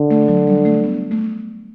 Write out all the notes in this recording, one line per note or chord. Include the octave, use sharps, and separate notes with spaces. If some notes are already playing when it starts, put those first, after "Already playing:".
Already playing: D3
A3
F#3
G3
A3
B3
A3